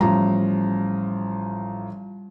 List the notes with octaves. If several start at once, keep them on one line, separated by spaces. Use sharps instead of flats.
A1 F3 G3 A#5